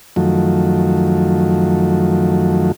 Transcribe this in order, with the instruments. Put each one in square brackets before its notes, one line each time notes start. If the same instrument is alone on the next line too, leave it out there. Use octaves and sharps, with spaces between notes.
[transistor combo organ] F#2 D#3 F3 F#3 A3